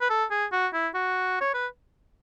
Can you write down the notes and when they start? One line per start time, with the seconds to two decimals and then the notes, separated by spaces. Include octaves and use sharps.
0.01 B4
0.10 A4
0.31 G#4
0.52 F#4
0.73 E4
0.94 F#4
1.41 C#5
1.54 B4